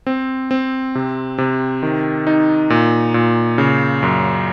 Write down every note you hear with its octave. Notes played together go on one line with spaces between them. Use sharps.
C4
C4
C3
C3
D#3
D#4
A#2
A#2
C#3
F#2